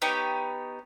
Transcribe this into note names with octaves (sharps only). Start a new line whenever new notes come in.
B3 D#4 G4 C#5